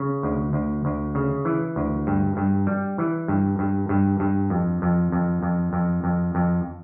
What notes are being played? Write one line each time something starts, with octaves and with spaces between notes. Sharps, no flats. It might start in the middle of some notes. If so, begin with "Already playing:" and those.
Already playing: C#3
D2
D2
D2
C#3
E3
D2
G2
G2
G3
E3
G2
G2
G2
G2
F2
F2
F2
F2
F2
F2
F2